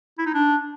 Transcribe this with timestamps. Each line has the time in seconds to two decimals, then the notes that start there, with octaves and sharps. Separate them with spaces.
0.18 E4
0.26 D#4
0.34 D4